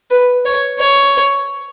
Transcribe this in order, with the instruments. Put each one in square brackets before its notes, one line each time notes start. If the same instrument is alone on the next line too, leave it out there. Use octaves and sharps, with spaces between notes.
[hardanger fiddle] B4
C#5
C#5